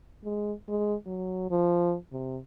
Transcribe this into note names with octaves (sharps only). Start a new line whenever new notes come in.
G#3
G#3
F#3
F3
C3